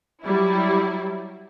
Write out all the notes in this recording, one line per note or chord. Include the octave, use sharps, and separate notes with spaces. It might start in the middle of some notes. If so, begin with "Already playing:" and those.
F#3 G3 E4